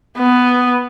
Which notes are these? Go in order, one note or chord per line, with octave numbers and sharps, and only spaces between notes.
B3